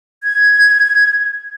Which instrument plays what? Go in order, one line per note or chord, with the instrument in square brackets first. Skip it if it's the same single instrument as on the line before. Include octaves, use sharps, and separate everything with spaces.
[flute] G#6